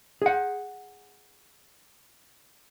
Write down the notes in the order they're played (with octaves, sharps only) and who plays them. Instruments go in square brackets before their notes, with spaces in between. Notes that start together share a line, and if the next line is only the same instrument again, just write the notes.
[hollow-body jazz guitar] G#4 F#5